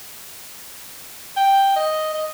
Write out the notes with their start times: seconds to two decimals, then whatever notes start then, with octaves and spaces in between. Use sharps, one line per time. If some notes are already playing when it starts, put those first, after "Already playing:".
1.37 G5
1.76 D#5
2.14 D#5